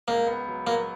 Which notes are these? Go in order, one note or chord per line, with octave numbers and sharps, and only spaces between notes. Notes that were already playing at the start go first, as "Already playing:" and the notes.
C#2 A#3
B3
F#3
F#3 A#3